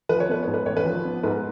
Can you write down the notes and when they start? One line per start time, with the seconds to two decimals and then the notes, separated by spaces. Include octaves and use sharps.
0.09 F3 B4
0.20 C#5
0.29 B3 B4
0.43 G#2 C#5
0.54 B4
0.66 A1 C#5
0.77 B4
0.85 F3
1.05 B3
1.23 G#2 B4